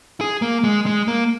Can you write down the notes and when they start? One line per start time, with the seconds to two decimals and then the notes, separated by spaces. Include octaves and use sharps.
0.21 G#4
0.42 A#3
0.64 G#3
0.86 G#3
1.08 A#3